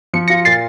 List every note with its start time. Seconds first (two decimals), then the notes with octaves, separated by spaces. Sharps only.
0.14 F3 C#7
0.28 F4 A#6 C#7
0.45 A#2 A6 C7